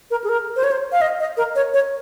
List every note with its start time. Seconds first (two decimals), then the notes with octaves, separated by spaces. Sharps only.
0.11 A#4
0.24 G#4
0.29 A#4
0.56 C5
0.64 C#5
0.71 C5
0.92 F5
1.01 D#5
1.20 D#5
1.37 A#4
1.55 C#5
1.74 C#5